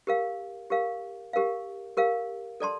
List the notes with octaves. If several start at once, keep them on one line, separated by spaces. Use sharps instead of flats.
G4 A#4 F5
G4 A#4 F5
G4 A#4 F5
G4 A#4 F5
A4 D5 A5 C6